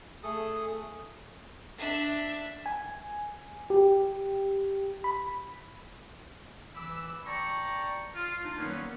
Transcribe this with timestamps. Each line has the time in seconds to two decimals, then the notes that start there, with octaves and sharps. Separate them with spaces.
0.23 A3 G#4 A4 D#6
1.78 D4 E5
2.66 G#5
3.70 G4
5.04 B5
6.75 E3 B5 D6 E6
7.26 D5 G5 A5 A#5 C#6
8.14 F4
8.44 D4 D#4 F4
8.57 D#3 F#3 G3 A#3 B3 C#4